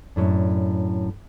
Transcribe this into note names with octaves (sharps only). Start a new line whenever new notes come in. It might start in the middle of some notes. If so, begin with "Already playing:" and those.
F#2 A2 D4